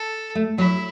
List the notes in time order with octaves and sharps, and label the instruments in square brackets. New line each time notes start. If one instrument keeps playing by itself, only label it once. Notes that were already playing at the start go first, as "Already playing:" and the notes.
Already playing: [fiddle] A4
[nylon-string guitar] A3
[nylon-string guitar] F#3 [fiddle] E4